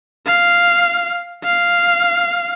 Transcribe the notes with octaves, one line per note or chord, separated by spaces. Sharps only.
F5
F5